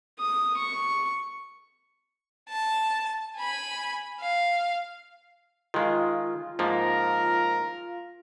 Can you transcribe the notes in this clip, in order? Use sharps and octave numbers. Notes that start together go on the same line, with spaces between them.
D#6
C#6
A5
G#5 B5
F5
D#3 G#3 F4
G#2 F3 A#3 A#4